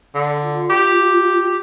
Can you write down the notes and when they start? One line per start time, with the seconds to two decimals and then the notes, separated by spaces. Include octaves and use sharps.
0.15 D3
0.43 F4
0.70 G4